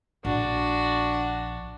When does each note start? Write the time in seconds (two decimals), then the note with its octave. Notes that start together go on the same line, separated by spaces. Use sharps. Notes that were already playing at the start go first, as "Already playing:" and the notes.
0.25 A#1 D4 F#4